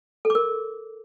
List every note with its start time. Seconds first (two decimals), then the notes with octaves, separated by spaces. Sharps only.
0.25 A4
0.30 D6
0.35 A#4